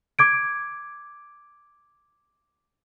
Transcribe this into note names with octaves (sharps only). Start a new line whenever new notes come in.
D6 G#6 D7